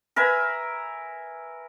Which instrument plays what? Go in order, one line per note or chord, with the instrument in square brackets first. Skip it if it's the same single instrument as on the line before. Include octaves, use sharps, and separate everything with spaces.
[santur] A#4 B4 E5 G#5